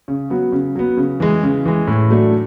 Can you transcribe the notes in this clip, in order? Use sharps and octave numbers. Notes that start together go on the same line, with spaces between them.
C#3
F#3 B3
C#3
F#3 B3
C#3
E3 G#3
C#3
E3 G#3
A2
F#3 A3 D4